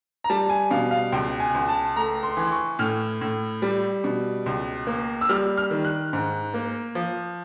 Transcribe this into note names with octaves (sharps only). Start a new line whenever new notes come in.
A#5
G3 A5
G#5
B2 F5
F5
C#2 G5
G#5
C#2
A5
A3 A#5
C6
E3
C#6
A2 F6
A2
G3
B2
C#2
A#3
E6
G3 F6
F6
D#3
F#6
G#2
A#3
F3